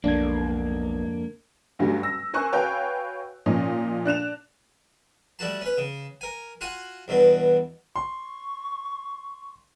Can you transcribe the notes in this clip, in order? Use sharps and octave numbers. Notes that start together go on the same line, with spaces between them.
B1 F2 G#2 D3 A#3 D4 G#6
D2 G2 D3 F#3 G3
E6 A#6
A#4 C5 G#5 C#6 F#6
F#4 B4 C#5 F5 G5 G#5
A#2 F3 C#4 D#4
D4 F#6 E7 F7
G3 A3 F#4 A5
C#4 B4
C#3
A#4 G#5
F4 F#4 F#5 G#5
E2 G2 B2 B3
C6 C#6